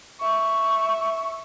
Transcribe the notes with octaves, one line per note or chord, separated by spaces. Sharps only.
E5 C#6